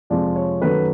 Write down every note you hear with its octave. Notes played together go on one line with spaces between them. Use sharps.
F2 C3 F3 G#3 D5
C#5
F#2 D#3 F#3 A3 B4